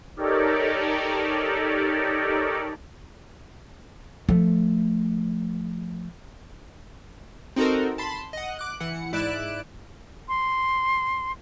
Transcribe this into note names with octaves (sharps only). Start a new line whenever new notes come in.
D#4 G4 A4 A#4 C#5 D5
F3 A3
C4 D#4 F#4 A4 A#4
A5 B5 C6
D#5 F#5
D6 F#6
E3 F#5 C#7
G#2 E4 D5 F#6 D7 E7
C6